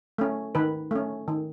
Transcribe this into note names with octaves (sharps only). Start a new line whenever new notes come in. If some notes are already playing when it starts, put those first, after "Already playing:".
A3 C#4
D#3 B4
A3 C#4
D#3